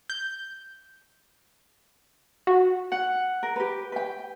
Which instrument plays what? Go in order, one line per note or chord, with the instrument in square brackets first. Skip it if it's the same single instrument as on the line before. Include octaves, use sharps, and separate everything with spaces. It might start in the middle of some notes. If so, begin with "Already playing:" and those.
[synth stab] G6
F#4
[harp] F#5
[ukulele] A#4
G4 B4
B4 G5